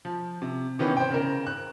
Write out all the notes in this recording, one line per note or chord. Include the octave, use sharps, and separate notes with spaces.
F3
C3
C3 D#3 E3 B3 C#4
C5 G5
C#3 A#4
F#6